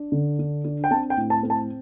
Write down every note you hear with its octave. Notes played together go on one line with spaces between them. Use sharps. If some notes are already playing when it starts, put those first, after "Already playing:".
Already playing: D4
D3
D4
D4
G5
C4 A5
G5
A2
A5
C4
A5